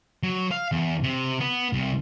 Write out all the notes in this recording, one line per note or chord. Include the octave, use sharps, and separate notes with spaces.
F#3
F5
E2
C3
B3
C2